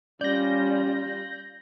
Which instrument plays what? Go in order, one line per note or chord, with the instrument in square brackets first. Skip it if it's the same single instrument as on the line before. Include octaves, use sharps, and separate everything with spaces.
[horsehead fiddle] G3 F4 [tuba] C#4 [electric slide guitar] D5 [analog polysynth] G6 A#6